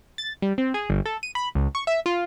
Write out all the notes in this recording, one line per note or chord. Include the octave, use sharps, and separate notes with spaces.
A6
G3
C4
G#4
G1
A4
D#7
B5
C#2
C#6
E5
F4